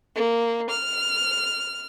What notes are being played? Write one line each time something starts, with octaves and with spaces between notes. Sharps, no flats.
A#3
F6